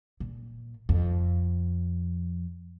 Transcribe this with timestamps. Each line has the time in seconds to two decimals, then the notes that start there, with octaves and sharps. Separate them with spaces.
0.20 A#2
0.89 F2